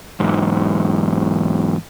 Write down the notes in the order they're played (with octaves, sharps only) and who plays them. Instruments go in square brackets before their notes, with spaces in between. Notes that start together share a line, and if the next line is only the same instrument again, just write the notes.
[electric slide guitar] E2 G#2